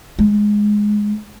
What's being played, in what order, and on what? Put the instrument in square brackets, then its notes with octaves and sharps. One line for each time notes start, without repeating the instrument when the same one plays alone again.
[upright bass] G#3